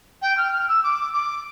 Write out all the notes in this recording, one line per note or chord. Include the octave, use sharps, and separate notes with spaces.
G5
F6
F6
E6
D6
D6